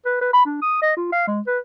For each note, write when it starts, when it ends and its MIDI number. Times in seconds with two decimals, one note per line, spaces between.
0.06 0.20 71
0.21 0.31 71
0.33 0.45 83
0.46 0.61 62
0.62 0.79 87
0.82 0.94 75
0.96 1.10 65
1.12 1.27 77
1.27 1.41 56
1.47 1.59 71